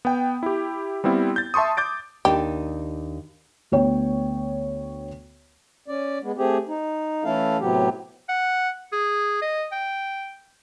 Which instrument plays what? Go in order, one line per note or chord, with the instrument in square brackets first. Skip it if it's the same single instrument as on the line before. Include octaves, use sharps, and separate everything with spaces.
[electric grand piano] B3 G5
E4 G4
G3 B3 C4 E4
G6 A6
E5 A5 C6 C#6 D#6
D6 G6 A6 D7
[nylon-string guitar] D#2 D4 D#4 [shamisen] G4
[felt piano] D2 B3 C#5 G5
[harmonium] C#4 D5
G#3 B3
A3 C4 G4 G#4
D#4
E3 A3 C#4 E4 A4 F5
A2 C3 F#3 B3 G4
[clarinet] F#5
G#4
D#5
G5